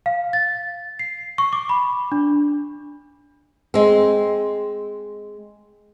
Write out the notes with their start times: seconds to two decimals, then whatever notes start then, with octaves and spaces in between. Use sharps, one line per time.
0.06 F5
0.33 A6
0.99 C7
1.38 C#6
1.53 D6
1.69 B5
2.12 D4
3.74 G#3 C4